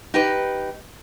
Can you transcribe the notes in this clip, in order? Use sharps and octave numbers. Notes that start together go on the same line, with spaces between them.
D#4 G4 B4